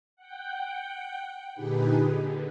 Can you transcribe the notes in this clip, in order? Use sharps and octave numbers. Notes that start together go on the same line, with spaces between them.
F#5 G5
A#2 D3 D#4 G4 G#4 B4
D3